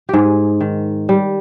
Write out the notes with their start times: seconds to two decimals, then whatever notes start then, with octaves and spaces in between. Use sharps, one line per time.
0.09 G#2 G4 G#4
0.61 D#3
1.09 G3